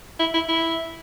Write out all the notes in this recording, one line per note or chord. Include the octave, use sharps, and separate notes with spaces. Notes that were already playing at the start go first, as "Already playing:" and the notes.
E4
E4
E4